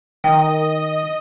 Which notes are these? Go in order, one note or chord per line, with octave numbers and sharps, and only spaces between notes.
D#3 D#5 G5